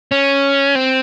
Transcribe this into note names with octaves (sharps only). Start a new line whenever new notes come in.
C#4
C4